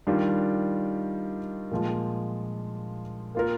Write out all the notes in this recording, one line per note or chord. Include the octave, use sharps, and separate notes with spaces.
D#3 G3 D4 F4
A#2 F3 G#3
A#3 F4 A#4